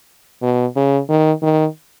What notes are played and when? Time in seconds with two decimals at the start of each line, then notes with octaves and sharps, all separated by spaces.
0.42 B2
0.76 C#3
1.09 D#3
1.42 D#3